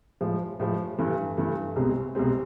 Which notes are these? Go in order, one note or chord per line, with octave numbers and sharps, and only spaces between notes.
A2 F3 G#3
A2 F3 G#3
G2 E3 A3
G2 E3 A3
C2 B2 G#3 C4
C2 B2 G#3 C4